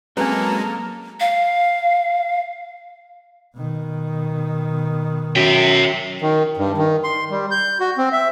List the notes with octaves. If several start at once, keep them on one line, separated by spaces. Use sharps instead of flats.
F#3 G#3 A#3 C4 C#4 A4 B4 A#5
F5
B2 D#3
F#2 E5 G5
D#3
G2
D#3
C6
G3
G6
F#4
C4
E5